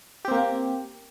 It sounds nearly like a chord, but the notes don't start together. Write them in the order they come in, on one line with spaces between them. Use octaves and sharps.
G4 C4 A#3